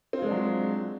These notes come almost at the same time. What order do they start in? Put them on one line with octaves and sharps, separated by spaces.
C4 F4 G#3 D4 F#3